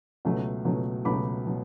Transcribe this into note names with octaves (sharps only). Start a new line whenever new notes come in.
C#2 B2 F#3 A3
C#2 B2 F#3 A3
C#2 B2 F#3 A3 B5 D6
B2 F#3